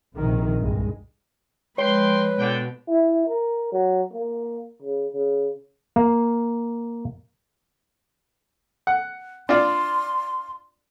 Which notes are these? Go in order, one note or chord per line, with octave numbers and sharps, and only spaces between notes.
A#1 C3 D#3
C2 G2 G#3
F3 G#3 B4 C#5 G5 C6
B2 D3 G5
E4
A#4
F#3
A#3
C#3
C#3
A#3
F#5
D4 F4 D5 C6